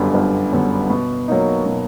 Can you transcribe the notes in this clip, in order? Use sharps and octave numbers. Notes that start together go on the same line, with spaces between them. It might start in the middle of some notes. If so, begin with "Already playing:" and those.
Already playing: G1 F#2 D3 G3 B3
G1
F#2 D3 G3 B3
B2
F#3 A#3 D#4
B2